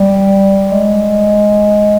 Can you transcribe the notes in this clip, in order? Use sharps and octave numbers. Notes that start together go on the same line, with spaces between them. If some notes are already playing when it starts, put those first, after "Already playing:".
Already playing: G3
G#3